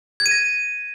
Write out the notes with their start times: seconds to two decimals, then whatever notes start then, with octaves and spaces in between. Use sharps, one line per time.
0.20 G#6
0.26 D#7
0.31 A#6